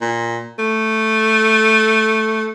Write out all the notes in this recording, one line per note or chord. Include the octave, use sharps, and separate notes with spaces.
A#2
A3